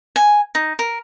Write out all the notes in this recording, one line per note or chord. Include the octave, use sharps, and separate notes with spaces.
G#5
D#4
A#4